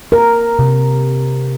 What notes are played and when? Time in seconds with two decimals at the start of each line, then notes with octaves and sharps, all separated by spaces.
0.12 A#4
0.59 C3